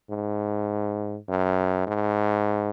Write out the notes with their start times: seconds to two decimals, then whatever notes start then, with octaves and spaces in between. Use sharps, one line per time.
0.10 G#2
1.29 F#2
1.87 G#2